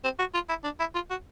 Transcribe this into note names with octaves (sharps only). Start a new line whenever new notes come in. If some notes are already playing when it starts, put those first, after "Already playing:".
C4
F#4
F4
E4
D4
E4
F4
F#4